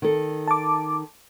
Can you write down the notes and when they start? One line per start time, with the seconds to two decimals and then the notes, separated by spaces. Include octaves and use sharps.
0.02 D#3 A4
0.48 A5 D6